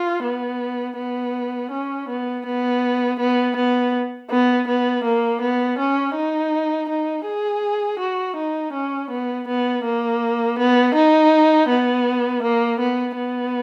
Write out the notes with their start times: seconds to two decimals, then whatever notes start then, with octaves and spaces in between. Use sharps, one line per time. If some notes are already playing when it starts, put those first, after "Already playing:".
Already playing: F4
0.24 B3
0.97 B3
1.71 C#4
2.09 B3
2.46 B3
3.20 B3
3.56 B3
4.30 B3
4.68 B3
5.04 A#3
5.41 B3
5.79 C#4
6.16 D#4
6.89 D#4
7.26 G#4
7.99 F#4
8.36 D#4
8.73 C#4
9.10 B3
9.48 B3
9.85 A#3
10.59 B3
10.95 D#4
11.69 B3
12.43 A#3
12.80 B3
13.17 B3